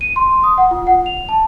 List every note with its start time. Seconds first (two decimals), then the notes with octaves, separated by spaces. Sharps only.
0.01 D#7
0.16 C6
0.44 D#6
0.58 F#5
0.71 F4
0.87 F#5
1.06 F7
1.29 A5